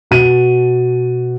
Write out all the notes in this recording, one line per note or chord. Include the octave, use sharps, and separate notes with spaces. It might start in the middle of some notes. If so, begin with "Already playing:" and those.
B2 D#7